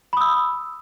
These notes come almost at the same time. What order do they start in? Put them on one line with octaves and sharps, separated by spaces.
B5 D#6 E6